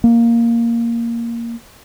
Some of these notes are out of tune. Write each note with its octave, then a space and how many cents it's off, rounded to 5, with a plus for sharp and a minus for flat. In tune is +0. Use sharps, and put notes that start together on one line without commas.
A#3 +0